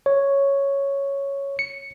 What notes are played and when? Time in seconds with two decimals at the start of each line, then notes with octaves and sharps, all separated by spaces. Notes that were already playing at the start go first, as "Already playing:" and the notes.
0.06 C#5
1.59 C#7